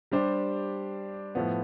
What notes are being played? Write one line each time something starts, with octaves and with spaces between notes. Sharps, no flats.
G3 D4 G4 C5
A2 F3 B3